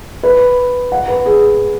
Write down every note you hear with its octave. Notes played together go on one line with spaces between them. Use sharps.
B4
F#5
B4
G#4